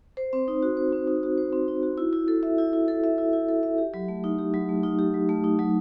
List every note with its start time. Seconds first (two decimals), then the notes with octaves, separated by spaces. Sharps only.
0.17 C5
0.33 C4
0.48 D#4
0.62 F#4
0.77 C5
0.92 C4
1.07 D#4
1.23 F#4
1.38 C5
1.53 C4
1.68 D#4
1.83 F#4
1.98 E4
2.13 E4
2.28 A4
2.43 E5
2.58 E4
2.73 E4
2.88 A4
3.04 E5
3.18 E4
3.33 E4
3.48 A4
3.63 E5
3.78 G4
3.94 F#3
4.08 A3
4.24 D#4
4.39 G4
4.54 F#3
4.69 A3
4.83 D#4
4.99 G4
5.14 F#3
5.29 A3
5.44 D#4
5.59 F#3